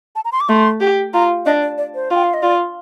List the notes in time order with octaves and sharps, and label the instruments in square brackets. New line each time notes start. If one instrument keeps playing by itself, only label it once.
[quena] A5
A#5
C6
D6
[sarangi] A3 [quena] C6
[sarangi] G4
[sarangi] F4 [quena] A#5
[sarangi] D4 [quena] D#5
[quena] D5
D5
C5
[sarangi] F4 [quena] G5
[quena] F5
D#5
[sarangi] F4 [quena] D5